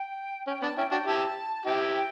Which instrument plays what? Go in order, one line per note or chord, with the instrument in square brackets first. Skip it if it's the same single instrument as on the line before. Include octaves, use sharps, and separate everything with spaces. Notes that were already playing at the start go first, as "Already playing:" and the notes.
Already playing: [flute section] G5
[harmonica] C#4 [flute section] G5
[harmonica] B3 D4 [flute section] A5
[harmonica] C#4 E4 [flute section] G5
[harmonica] D4 F#4 [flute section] G5
[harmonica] E4 G4 [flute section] A5
[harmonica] E4 G4 [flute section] G5
[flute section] G5